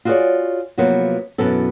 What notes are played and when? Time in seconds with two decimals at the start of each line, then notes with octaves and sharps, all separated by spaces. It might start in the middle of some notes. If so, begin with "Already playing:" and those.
0.05 F4 F#4 G#4 A#4 C#5 D5
0.78 C3 F3 F#3 A#3 B3
1.38 F#2 B2 E3 B3 A4